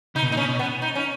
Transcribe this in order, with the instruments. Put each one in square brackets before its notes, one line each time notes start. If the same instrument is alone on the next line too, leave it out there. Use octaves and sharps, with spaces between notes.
[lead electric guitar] C#3 [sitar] D#4
[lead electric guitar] B2
[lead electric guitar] A#2 [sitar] D#4
[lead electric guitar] B2 [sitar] C#4
[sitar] B3
D#4
C#4